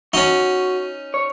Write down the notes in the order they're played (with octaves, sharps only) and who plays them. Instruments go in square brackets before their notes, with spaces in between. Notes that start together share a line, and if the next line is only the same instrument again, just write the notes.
[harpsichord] C#4 D#4 [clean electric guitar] F#4
[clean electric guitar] C#5